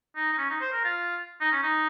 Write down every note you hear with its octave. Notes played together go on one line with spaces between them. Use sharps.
D#4
D#4
C#4
D#4
C5
A#4
F4
D#4
C#4
D#4